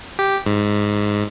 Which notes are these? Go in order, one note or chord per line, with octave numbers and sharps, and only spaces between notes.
G4
G#2